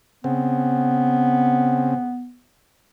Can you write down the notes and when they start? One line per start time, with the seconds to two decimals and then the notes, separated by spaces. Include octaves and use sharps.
0.24 C#3 B3 C4